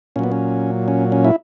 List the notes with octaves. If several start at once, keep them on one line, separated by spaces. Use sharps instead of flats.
A#2 F#3 B3 C#4
C#4
C#4
C#4
E4